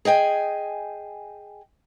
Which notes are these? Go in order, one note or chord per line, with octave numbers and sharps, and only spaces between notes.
G#4 D#5 G5 G#5